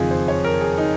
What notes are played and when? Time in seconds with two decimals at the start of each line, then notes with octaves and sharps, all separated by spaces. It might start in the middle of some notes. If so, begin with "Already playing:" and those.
Already playing: F#1 F2 D#3 F4 G#4
0.11 C5
0.28 C#5
0.44 A#4
0.61 G#4
0.78 D#4